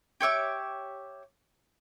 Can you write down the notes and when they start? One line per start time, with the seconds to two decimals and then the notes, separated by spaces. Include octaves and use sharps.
0.21 G4 C#5 E5 D6